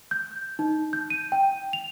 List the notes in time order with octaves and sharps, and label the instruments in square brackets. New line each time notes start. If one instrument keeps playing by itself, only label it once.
[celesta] G6
D#4
G6
D#7
G5
F7